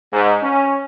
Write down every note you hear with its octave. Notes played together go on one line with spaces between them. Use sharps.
G#2
C#4